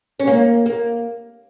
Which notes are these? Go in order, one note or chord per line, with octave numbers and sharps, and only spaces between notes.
C#4
A#3
A#3